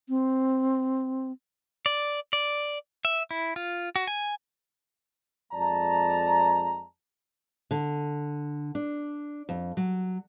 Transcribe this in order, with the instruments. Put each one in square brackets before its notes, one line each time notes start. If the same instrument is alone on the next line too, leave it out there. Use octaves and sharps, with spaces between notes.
[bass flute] C4
[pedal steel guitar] D5
D5
E5
E4
F4
F#4
G#5
[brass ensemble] F2 G#3 D5 A5 A#5
[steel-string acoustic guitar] D3
D4
F2
F#3